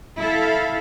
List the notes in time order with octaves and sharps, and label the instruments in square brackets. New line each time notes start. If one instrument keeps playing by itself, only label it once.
[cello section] E4 A4 E5 F5